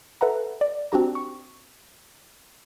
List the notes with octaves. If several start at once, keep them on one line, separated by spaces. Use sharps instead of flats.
A4 B4 E5 F#5 A#5
D5
C4 D4 F#4 G4 A#5
C#6